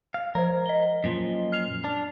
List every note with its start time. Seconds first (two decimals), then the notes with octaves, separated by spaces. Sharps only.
0.14 F5
0.35 F3 A#4 C5
0.66 D#5 G7
1.04 F#2 A#2 F3
1.52 F6 C7 F7
1.84 D4